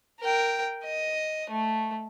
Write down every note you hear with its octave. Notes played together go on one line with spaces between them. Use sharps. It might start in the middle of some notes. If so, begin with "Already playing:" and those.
A#4 G5
D#5
A3